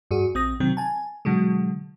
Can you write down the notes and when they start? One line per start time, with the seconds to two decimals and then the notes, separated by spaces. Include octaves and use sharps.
0.11 G2 F#4 G#4
0.34 A#1 C4 D#6 A#6
0.60 C3 D#3 F#3 C4
0.77 G#5 A5
1.25 B2 D3 F#3 G#3